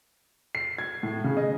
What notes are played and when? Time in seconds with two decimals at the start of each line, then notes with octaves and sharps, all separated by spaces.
0.55 C7
0.78 G#6
1.03 A2
1.24 C#3
1.37 D#5